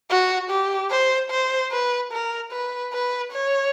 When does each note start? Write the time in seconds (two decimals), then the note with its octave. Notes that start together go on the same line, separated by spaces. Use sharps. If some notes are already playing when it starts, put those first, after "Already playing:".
0.10 F#4
0.50 G4
0.91 C5
1.31 C5
1.72 B4
2.12 A#4
2.52 B4
2.93 B4
3.33 C#5